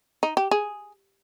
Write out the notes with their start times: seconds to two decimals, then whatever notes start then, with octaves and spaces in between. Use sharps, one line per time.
0.23 D#4
0.37 G4
0.51 G#4